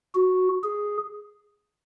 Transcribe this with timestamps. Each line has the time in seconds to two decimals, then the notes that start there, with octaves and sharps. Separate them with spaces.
0.15 F#4
0.63 G#4